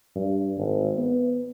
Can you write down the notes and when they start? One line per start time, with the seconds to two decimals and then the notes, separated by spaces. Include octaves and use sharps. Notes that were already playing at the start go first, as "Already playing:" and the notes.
0.16 G2
0.57 G#1
0.97 B3